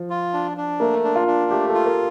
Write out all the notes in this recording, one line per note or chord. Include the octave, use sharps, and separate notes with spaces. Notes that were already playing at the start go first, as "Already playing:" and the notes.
Already playing: F3
F4
D4
D4
A3 A#3
D4
F4
D4
A3 G4
F4 A4
A#4